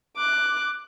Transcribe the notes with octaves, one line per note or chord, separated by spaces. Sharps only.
D6 F#6